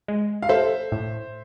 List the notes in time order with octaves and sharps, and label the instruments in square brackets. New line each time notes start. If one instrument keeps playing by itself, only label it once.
[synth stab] G#3
[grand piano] F5
[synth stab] A4 [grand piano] C5 E5
[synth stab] A2